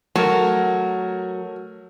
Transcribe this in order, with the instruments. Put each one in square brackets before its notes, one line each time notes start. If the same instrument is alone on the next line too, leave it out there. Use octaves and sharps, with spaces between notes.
[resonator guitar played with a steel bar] F#3 [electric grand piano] A3 A#4